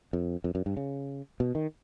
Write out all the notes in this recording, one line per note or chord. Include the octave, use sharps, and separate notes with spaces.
F2
F2
F#2
G2
C#3
B2
D#3